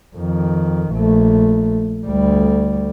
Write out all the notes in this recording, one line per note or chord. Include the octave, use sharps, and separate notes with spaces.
F2 D#3
A#1 A3
D2 G3